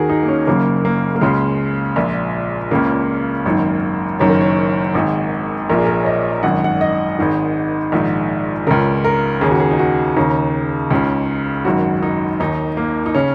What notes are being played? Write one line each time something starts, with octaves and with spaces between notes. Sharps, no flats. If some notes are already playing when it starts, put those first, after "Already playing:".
Already playing: D#2 D#3 F#4 G#4 A#4
D#4
A#3
C#4
F#1 F#2 C#3 A#3
A#3
A#3
C#2 C#3 G#3
A#1 A#2
C#2 C#3 A#3
G#1 F#2 D#3
F#1 F#2 D#3 C#5
A#4
C#5
G#1 G#2 D#3
A#1 A#2 A#4
G#4
A#4
C#5
D#5
G#1 F#2 D#3 F#5
F#5
D#5
G#1 G#2 D#3
A#1 G#2 D#3
C#2 C#3 A#4
A#4
D#2 C#3 G#4
F#4
G#4
D#4
F#4
D#2 C#3 D#4
C#2 C#3
G#1 F#2 D#3 F#4
D#4
D#2 D#3 D#4
A#3
D#4
C#3 C#4